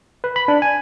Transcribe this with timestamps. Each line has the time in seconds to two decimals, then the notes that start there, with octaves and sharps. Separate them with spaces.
0.24 B4
0.36 B5
0.48 D4
0.62 G#5